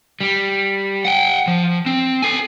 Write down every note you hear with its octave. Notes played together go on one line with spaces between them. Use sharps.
G3
F#5 G5
F3
C4
A4 G#5